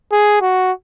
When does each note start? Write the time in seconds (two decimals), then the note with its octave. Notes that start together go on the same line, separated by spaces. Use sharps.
0.12 G#4
0.41 F#4